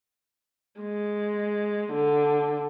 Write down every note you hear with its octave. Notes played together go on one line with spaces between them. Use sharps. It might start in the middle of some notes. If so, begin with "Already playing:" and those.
G#3
D3